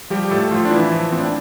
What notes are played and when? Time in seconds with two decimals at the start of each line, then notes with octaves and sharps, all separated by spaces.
0.10 F3 G3 G4
0.31 A2 A3 A4
0.51 A2 F3 F4
0.65 D4
0.71 E3 F3 E4
0.92 F3
1.12 A2 C4
1.19 D4